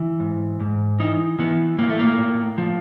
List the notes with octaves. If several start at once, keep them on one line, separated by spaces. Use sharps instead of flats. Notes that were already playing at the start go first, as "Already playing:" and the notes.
Already playing: E3
G#2
G#2
E3 D#4
E3 B3
A2 A#3
A3
A#3
A2
F3